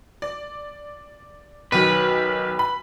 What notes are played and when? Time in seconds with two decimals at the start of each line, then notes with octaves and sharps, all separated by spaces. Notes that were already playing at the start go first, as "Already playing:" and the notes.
0.22 D5
1.72 B1 D#3 B4
2.59 B5